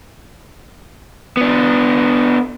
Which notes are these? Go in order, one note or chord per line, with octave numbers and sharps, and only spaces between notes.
B3 D4